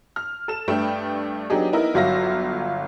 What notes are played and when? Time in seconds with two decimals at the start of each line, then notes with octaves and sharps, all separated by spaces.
0.16 F6
0.48 A4 E7
0.68 G2 A3 B4 G5
1.50 F#3 B3 D4 D#4 G4 G#4
1.73 B3 D#4 E4 A#4
1.94 G1 F#3 F4 E5 F5 A#6